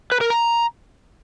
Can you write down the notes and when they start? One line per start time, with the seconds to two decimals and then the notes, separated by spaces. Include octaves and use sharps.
0.12 B4
0.21 A#4
0.30 A#5